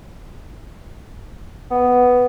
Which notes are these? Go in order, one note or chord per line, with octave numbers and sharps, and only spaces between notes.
B3